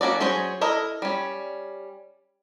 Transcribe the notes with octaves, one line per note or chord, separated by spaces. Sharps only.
A#3 C#4 F#4 D5
F#3 C#4 G#4 C5 C#5
E4 A4 A#4 D#5
G3 C#4